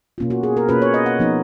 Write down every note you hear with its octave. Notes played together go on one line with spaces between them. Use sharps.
B2 A#3 C#4 F4
F#4
G#4
A#4
B2 A#3 C#4 F4 B4
C#5
D#5
F#5
F3 B3 D#4